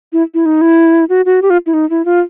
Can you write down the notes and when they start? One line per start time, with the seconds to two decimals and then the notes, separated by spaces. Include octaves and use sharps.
0.13 E4
0.34 E4
0.46 D#4
0.61 E4
1.09 F#4
1.25 F#4
1.42 G4
1.50 F4
1.66 E4
1.74 D#4
1.90 E4
2.05 F4